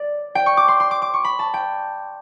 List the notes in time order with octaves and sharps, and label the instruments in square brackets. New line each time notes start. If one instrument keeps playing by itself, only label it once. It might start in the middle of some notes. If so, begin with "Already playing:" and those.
Already playing: [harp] D5
G5
C#6
D6
C6
C6
D6
D6
C#6
B5
A5
G5